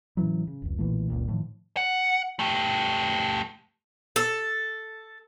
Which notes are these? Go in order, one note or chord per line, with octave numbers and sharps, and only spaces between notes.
A2 C#3 E3 F#3
C#3
F1 C#2
B1 A#2 E3 A3
F#1 C#2 A#2
A2 D#3 F3
F#5
A3 G4
A4